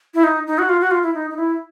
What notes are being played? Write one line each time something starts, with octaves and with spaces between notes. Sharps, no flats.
E4
D#4
D#4
F#4
F4
F#4
F4
E4
D#4
D#4
E4